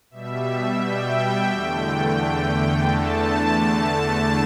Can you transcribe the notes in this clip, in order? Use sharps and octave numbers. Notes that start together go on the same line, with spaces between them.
B2 G3 E5
G5
E2 D3 A3 G5
E2 D3 A3 A5